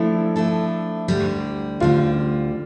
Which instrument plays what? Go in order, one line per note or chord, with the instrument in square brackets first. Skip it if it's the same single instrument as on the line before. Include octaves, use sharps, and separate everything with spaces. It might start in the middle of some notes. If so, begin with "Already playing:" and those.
Already playing: [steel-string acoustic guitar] F3 A3 D4 A4 [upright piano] E4
[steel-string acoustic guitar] F3 A3 D4 A4
D2 D3 G3
[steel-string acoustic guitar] D2 D3 G3 [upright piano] F4